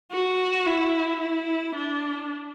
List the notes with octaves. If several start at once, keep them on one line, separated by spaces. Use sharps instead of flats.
F#4
E4
E4
D4